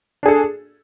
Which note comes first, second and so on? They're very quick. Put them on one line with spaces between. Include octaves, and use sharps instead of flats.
D4 G#4 A4